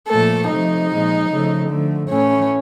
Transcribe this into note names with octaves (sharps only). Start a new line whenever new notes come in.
A#2 F3 A3 A4
C3 F3 A3 D#4
A#2 F3 G#3
C#3 F3 A3
D3 F3 A3
A2 E3 A3 C#4